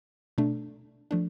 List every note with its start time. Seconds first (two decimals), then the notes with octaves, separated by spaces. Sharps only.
0.38 B2 A3 D4
1.11 F3 A3 D4